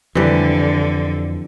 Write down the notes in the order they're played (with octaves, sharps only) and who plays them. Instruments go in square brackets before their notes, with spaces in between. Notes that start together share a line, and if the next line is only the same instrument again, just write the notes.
[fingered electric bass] F2 [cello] D3 [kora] E3 G3